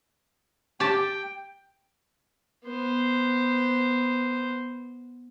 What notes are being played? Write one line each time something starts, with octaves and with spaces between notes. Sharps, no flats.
G4 G5 A5
B3 C5